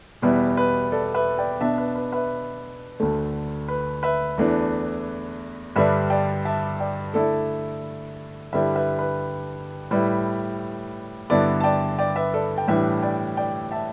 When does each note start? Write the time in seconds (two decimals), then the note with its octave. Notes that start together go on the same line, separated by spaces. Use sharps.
0.22 E2 B2 G3 E4 B4
0.57 B4
0.92 A4 D5
1.14 B4 E5
1.38 D5 G5
1.61 B2 B3 D4 E5 A5
1.78 B4
1.96 B4
2.12 B4 E5
3.00 D2 D3 A3
3.68 B4
4.03 B4 E5
4.38 E2 E3 A3 D4
5.76 G2 D3 G3 D4 B4 E5
6.10 D5 G5
6.45 E5 A5
6.80 D5 G5
7.14 D3 A3 E4 A4 D5
8.53 G2 D3 G3 E4 B4 E5
8.76 B4 E5
8.99 B4
9.91 A2 G3 E4 B4
11.30 G2 D3 B3 E4 A4 D5
11.60 A5
11.64 D5 G5
11.98 D5 G5
12.16 B4 E5
12.34 A4 D5
12.58 G5
12.68 A2 E3 G3 D4 B4 E5
13.02 D5 G5
13.37 D5 G5
13.71 E5 A5